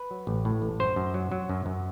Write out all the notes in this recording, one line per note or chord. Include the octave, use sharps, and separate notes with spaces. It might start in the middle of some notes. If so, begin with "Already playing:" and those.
Already playing: B4
F#3
A1
A2
A1
F#2 C5
F#2
F#3
F#3
F#2
F#2